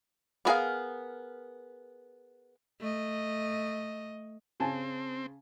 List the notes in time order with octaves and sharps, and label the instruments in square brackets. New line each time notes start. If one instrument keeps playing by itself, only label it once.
[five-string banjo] G3 B3 G#4 A#4 F5
[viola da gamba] A3 D#5
[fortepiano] C#3 G#5 A5 [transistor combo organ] C4